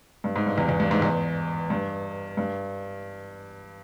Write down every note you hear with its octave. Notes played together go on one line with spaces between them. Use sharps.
G2
G#2
G2
E2
E2
G2
G#2
E2
G2
G2